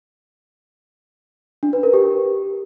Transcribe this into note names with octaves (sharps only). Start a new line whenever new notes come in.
D4
B4
A#4
G4